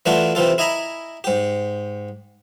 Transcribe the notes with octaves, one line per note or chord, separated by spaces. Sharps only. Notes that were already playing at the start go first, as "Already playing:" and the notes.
E3 A3 D4 F4 F#4
C3 E3 F4 A4
E4 D#5 G#5 A#5 B5
G#2 G4